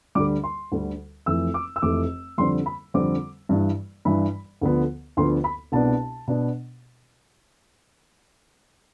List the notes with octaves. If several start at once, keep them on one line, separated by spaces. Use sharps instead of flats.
D2 D3 G3 D6
C6
D2 D3 G3
F1 F2 E3 A3 E6
D6
E6
F1 F2 E3 A3 D6
F2 D3 G3 C4 C6
B5
F2 D3 G3 C4 D6
G2 E3 G3
G2 E3 G3 B5
D2 D3 F3 B3
D2 D3 F3 B3 C6
B5
C2 B2 B3 D4 A5
B2 B3 D4